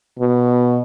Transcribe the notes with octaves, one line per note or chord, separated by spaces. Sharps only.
B2